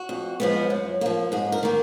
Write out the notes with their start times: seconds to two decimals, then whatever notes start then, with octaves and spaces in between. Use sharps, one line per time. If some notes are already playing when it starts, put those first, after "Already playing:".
Already playing: F#4
0.09 F2
0.40 F3 G#3 B3
0.70 F#2
1.01 F3 A#3
1.32 G#2 G#4
1.52 A#4
1.63 D#3 A#3